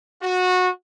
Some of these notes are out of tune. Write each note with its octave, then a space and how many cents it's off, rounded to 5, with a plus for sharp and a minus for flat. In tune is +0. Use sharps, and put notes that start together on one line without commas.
F#4 -20